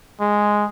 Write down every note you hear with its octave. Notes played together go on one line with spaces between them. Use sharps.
G#3